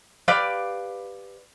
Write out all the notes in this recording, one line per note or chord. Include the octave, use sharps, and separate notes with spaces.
G4 B4 D5 F5